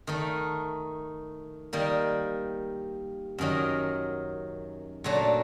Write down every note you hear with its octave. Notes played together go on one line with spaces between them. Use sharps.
D#3 A3 D#4
D#3 G3 A#3
F#2 D#3 F#3
A#2 F#3 A3 D4